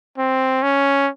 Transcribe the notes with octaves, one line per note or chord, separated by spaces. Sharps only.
C4
C#4